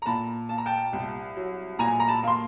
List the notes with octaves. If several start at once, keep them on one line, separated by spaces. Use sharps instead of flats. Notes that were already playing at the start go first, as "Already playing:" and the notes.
A#5
A#2 A5 B5
A#3 A5
A#5
G5 A5
C2
F#3
A#2 G#5 A#5
A#5
A5 B5
A#3 C6